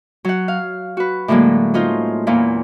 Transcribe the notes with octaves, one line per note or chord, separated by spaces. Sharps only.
F#3 F#5
F5
F#4 B4
A2 D3 F#3 G#3 A#3
C#4 D#4 F4 C5
E2 A#2 A#3 E4 F4